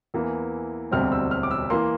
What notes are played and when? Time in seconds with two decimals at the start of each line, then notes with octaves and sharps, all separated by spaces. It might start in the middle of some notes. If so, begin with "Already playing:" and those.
0.14 E2 E3 A#3
0.92 E1 D2 C3 G3 C4 F6
1.12 E6
1.31 F6
1.43 D6
1.51 E6
1.70 E3 A#3 C6